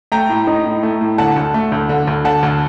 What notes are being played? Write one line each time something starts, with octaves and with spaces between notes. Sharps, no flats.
A3 G5 A#5
A2
D#4
A2
A3
A2
D3 F#5 A5
D2
A3
D2
D3
D2
D3 F#5 A5
D2